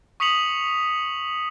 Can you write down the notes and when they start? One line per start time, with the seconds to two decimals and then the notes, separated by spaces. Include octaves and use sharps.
0.20 C#6 D#6 B6 C#7 F7 F#7